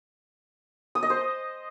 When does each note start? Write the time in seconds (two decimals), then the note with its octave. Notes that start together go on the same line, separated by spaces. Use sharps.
0.95 D#6
1.03 D#5
1.10 C5